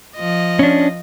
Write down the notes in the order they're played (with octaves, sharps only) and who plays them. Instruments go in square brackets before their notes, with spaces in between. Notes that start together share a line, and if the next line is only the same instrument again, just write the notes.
[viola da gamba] F3 D#5
[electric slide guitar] C#4 D4